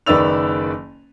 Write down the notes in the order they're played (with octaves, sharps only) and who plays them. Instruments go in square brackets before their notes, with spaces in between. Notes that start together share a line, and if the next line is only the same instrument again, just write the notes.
[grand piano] F#1 D#3 B4 D5 E6 F7